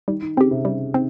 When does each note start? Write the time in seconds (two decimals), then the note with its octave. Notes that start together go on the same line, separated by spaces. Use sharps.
0.08 D#3 G3
0.22 D#3
0.37 C#3 C4 G4
0.51 C3
0.65 C#3 G3
0.94 D#3 C4